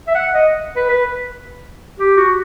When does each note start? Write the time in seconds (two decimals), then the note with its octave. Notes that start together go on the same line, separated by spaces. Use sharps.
0.07 E5
0.15 F#5
0.34 D#5
0.76 B4
0.89 B4
1.99 G4
2.17 F#4